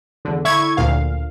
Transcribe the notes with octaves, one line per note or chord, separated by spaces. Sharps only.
E2 D3
D3 E4 C#6 G#6
D2 A#2 F5